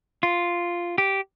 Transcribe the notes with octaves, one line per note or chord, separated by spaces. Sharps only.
F4
G4